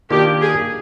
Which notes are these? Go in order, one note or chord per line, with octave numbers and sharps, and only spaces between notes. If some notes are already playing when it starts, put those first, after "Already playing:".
D#3 A#3 D4 F4 G4 A#4
G#4